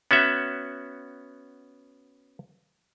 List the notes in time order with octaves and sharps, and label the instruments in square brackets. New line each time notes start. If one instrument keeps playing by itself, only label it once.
[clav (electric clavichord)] B3 C#4 F#4 E5